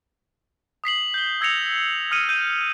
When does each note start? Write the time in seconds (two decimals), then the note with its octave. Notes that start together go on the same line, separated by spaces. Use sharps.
0.84 D#6 B6 C7 F#7
1.14 G6 G7
1.41 E6 G#6 A#6 C#7 F7
2.11 D#6 F6 C#7 D#7
2.29 G6 D#7